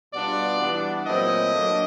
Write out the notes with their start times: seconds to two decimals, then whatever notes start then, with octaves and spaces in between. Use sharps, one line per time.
0.14 B2 G3 B3 D4 F4 D5
0.60 E3 G3 B3 D4
1.06 A#2 F#3 A3 C4 E4 D#5
1.53 D3 F#3 A#3 D4